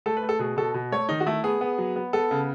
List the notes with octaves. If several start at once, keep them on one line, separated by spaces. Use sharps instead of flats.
A3 A4
B4
A3
A4
B2 G#4
B2 A4
B2
A3 C#5
D#3 D#4
F#4
A3 E4
B3 G#4
B3
F#3
B3
B3 A4
C#3